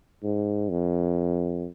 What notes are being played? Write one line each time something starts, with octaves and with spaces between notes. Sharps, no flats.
G#2
F2